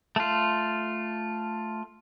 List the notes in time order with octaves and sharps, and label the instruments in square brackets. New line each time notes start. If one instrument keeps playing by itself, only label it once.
[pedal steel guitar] A3 F4